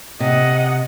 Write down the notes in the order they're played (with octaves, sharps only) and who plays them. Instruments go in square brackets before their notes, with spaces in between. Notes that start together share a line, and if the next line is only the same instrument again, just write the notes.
[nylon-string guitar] C3 [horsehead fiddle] D#5 F#5